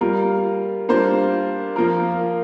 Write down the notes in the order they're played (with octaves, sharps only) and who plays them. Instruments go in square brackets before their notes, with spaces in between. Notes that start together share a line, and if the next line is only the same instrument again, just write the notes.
[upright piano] G3 A#3 F4 A#4
G3 A#3 D4 F4 C5
F3 A#3 F4 A#4